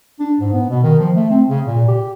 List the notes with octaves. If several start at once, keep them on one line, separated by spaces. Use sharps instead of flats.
D4
G#2
B3
B2
D#3
F3
A3
C4
C#3
A#2
G4